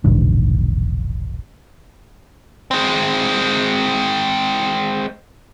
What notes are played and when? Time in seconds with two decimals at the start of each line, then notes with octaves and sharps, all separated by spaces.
0.04 E1 A#1 G#2 D3
2.71 G#3 C4